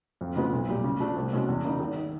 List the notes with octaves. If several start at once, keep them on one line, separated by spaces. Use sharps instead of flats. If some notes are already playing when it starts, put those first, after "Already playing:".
F2
C#3 F3 G#3 B3
B1
A#2 G3
C#3
F3 A3 D4
C2
B2 G#3 C#4 F#4
E2
C#3 F#3 A#3 D#4
G#1
D#3